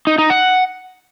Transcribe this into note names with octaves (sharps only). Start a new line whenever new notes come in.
D#4
D#4
F#5